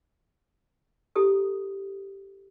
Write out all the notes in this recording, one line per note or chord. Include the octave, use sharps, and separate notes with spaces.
E4 G4 A4 D#6